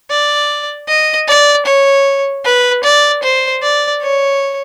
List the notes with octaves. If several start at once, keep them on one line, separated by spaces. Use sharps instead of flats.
D5
D#5
D5
C#5
B4
D5
C5
D5
C#5